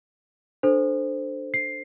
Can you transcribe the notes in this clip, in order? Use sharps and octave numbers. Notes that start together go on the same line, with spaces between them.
D4 A4 C5
C7